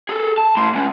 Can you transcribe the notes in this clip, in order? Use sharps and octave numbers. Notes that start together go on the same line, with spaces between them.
G#4 A4
A5
A2 C6
G#3 C#4